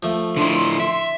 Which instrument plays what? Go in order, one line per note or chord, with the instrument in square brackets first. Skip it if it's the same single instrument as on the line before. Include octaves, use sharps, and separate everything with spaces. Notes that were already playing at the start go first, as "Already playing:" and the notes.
[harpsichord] F3 A3
[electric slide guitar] D3 D4 E4 [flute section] C6
[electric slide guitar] E5